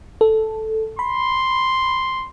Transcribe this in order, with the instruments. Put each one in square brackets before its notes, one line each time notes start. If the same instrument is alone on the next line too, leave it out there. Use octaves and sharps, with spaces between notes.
[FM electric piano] A4
[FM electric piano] B5 [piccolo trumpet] C6